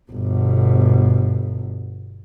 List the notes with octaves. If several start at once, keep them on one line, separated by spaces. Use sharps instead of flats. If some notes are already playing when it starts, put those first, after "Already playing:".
G1 B2